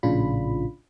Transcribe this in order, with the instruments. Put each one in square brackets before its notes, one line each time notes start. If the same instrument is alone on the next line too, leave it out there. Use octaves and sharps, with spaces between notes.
[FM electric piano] A#1 A2 C#3 D4 F4 B5